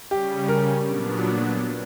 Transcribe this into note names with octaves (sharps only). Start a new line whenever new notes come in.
C#3 G3 C#4 G4
A#4
A#2 F#3 B3 D4